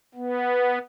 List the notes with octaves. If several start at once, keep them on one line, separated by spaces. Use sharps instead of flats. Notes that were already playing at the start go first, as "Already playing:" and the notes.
B3